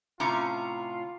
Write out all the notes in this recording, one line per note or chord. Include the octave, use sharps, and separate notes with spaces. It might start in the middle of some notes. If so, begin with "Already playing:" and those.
A2 C3 C#4 F4 A#5 D6 C#7